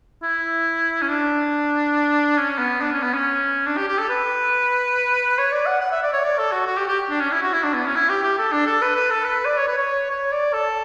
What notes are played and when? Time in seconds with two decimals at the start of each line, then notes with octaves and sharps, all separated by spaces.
0.23 E4
1.02 C#4
1.09 D4
2.38 C#4
2.59 B3
2.81 D4
2.92 C#4
3.03 B3
3.14 C#4
3.66 D4
3.77 G4
3.88 G4
3.99 A4
4.09 B4
5.38 C#5
5.52 D5
5.66 F#5
5.81 F#5
5.92 E5
6.03 D5
6.13 C#5
6.24 D5
6.38 A4
6.52 F#4
6.67 F#4
6.77 G4
6.88 G4
7.10 D4
7.20 C#4
7.32 E4
7.42 F#4
7.53 E4
7.63 D4
7.74 B3
7.85 C#4
7.95 E4
8.09 G4
8.24 G4
8.39 A4
8.52 D4
8.67 A4
8.82 B4
8.96 B4
9.10 A4
9.24 B4
9.45 D5
9.57 C#5
9.68 B4
9.78 C#5
10.11 C#5
10.32 D5
10.53 A4